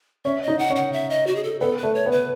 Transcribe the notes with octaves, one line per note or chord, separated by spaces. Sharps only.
C#4 E5
D#5
D#4
F#5
C#4
F#5
E5
D#5
F#4
G#4
A4
B3 A4
B4
A3
C#5
B3
B4